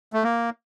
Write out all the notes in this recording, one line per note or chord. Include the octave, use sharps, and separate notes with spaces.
A3
A#3